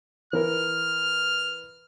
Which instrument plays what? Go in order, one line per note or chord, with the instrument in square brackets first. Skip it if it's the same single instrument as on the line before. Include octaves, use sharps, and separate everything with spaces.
[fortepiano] E3 A#4 [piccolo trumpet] F6